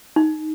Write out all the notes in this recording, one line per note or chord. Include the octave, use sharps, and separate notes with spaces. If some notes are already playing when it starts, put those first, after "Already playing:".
D#4